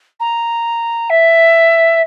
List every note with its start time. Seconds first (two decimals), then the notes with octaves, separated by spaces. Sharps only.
0.20 A#5
1.09 E5